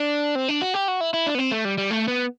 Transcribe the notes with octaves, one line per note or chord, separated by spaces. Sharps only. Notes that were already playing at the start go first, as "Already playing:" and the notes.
Already playing: D4
C4
D4
F#4
G4
F#4
E4
E4
D4
B3
C4
A3
G3
G3
A3
B3